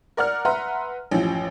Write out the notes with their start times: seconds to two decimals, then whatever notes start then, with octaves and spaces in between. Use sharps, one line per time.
0.17 A#4 D5 F#5 F6
0.45 B4 E5 F#5 A#5 C6
1.11 A1 F#2 F3